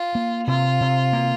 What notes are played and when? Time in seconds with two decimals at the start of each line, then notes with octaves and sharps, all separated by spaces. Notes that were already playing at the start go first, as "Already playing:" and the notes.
Already playing: F4
0.15 A#3
0.47 C3 F4
0.81 C3
1.13 A#3